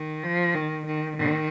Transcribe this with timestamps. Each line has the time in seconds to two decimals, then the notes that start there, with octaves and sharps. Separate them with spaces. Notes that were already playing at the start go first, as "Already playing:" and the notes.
Already playing: D#3
0.24 F3
0.55 D#3
0.86 D#3
1.17 D#3